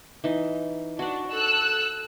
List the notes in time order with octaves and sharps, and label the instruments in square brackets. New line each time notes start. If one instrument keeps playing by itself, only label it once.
[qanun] E3 D#4
[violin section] D4 [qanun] F#4 F#5
[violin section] A4 E6 F#6